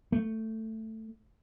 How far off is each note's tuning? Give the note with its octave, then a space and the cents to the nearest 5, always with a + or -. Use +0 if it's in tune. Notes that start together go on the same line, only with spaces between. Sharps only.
A3 +10